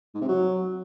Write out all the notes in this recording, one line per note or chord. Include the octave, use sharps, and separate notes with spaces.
G#2
C3
F#3